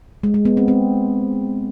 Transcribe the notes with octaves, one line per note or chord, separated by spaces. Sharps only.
G#3
G#3
B3
C4
C4